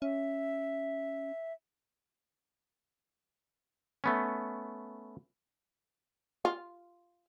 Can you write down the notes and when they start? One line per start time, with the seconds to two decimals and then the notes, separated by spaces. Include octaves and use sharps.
0.02 C#4 E5
4.04 A3 B3 C#4
6.45 F4